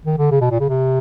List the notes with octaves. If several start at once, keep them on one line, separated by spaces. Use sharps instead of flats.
D#3
D3
C#3
B2
A#2
C#3
C3